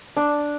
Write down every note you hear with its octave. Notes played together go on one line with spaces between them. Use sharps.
D4